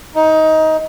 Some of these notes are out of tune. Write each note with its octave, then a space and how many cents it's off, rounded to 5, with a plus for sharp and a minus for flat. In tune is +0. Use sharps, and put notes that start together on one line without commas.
D#4 +20